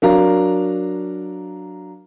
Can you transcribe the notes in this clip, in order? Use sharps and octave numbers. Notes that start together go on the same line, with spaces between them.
F#3 D4 A#4 F5 A#5